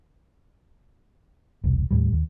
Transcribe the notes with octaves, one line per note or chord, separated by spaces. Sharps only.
E1 C2
D#2 A2 G3
D#2